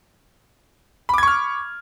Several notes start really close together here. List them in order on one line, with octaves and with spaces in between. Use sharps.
B5 D6 G#6 C#6 F6